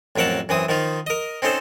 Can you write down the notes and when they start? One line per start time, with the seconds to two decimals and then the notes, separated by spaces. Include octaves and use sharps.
0.16 A1 F2 F#3 A#4 F#5 A5
0.49 F#2 E3 C4 D#6
0.69 D#3 F3 D#4 F4
1.07 A#4 D#5
1.42 C4 C#4 D#4 A4 C5